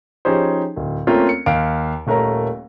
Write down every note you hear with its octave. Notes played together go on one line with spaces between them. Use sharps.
F3 C#4 D#4 G4 G#4 C5
D1
A3 A#3 C4 C#4 F4 A#4
C#7
D#2 F5 D7
D#1 A3 A#4 C#5 A#5